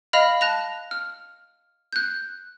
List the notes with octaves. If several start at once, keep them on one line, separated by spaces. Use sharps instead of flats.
D#5 F5 B5 F6 F7
A5 F#6 A#6 F7
F6
F#6 G6